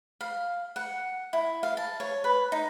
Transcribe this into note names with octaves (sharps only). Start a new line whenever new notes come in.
F5
F#5
E4
F5
A5
C#5
B4
D#4